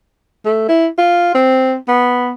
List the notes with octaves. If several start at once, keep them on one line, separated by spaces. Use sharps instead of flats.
A3
E4
F4
C4
B3